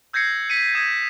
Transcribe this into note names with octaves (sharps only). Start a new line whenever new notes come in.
E6 G6 G#6 A#6 C7 C#7
B6 C#7 D#7
D#6 G#6 E7